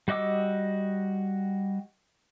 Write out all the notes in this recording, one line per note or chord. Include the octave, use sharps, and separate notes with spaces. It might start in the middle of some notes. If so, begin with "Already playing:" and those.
G3 F#4 D#5 D6 E6